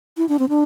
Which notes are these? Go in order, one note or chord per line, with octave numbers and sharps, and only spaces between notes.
E4
D4
C4
D4